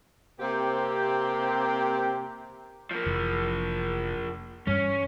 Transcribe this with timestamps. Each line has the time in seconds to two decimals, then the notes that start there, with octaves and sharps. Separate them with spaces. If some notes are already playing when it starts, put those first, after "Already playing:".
0.39 C3 A#3 C4 G4
2.91 F3 A#3
3.06 F1 E3
4.67 G2 E3 G3 C#4